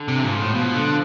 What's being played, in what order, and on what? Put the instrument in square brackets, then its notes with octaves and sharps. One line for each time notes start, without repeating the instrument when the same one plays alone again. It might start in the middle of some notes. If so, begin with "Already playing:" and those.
Already playing: [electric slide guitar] D3
[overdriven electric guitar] C3
[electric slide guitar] E3
[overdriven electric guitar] G#2 [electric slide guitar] F3
[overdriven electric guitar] A2
[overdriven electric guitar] B2 [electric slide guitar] F3
[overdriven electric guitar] D3